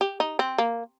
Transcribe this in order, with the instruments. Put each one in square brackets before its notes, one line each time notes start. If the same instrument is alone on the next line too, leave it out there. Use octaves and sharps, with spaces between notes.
[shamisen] G4
D#4
C4
A#3